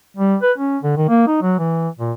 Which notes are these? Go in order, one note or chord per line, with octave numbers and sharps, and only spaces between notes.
G3
B4
C#4
D3
D#3
A#3
D#4
F#3
E3
A#2